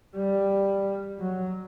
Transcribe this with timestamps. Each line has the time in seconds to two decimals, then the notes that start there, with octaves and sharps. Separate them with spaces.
0.15 G3
1.19 F#3